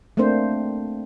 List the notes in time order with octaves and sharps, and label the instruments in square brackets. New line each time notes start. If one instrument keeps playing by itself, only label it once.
[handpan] A3 A#3 C4 D4 C5